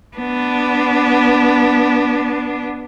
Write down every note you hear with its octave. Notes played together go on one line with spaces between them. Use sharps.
B3 D4